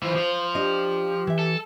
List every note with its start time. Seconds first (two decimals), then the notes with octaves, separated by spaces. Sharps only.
0.02 E3 F4 C5
0.16 F3 F4
0.55 D4 G4 D#5
1.27 E3 E5
1.39 A4